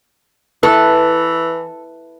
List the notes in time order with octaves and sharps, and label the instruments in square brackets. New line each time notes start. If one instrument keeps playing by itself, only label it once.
[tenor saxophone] E3 [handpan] E4 B4 [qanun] A4